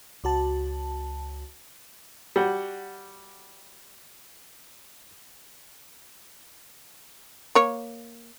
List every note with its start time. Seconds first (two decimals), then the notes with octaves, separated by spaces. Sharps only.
0.24 C#2 F#4 A5
2.36 G3 F#4 F#5
7.55 A#3 C#5